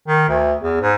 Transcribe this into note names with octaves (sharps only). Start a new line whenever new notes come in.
D#3
D2
E2
G#2